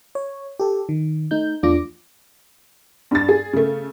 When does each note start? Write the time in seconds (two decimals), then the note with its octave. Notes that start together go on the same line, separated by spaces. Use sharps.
0.15 C#5
0.60 G4 A4
0.89 D#3
1.31 A3 D#4 G6
1.63 E2 A3 D4 F4 D6 A#6
3.11 G2 A6
3.29 G#4
3.53 C#3 A3